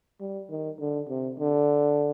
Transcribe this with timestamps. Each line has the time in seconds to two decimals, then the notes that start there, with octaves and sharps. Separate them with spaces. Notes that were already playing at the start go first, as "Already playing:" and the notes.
0.20 G3
0.50 D#3
0.80 D3
1.09 C3
1.39 D3